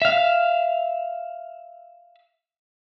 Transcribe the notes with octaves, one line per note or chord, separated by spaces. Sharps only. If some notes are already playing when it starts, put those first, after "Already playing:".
E5 F5